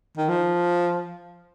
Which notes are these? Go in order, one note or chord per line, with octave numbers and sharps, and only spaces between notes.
D#3
F3